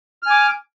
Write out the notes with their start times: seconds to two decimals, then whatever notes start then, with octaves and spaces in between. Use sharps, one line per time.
0.23 F6
0.26 G#5
0.30 D6